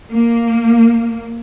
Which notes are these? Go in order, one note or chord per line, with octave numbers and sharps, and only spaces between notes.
A#3